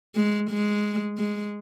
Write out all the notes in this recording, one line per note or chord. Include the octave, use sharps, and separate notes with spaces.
G#3
G#3
G#3